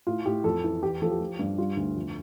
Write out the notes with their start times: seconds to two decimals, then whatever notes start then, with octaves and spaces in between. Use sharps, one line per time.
0.07 A2 F4
0.25 A2 G4
0.44 F2 A4
0.64 E3
0.82 E2 G4
1.02 F3 A4
1.11 G4
1.21 F3
1.39 G2
1.58 G3 F4
1.77 D2
1.96 F2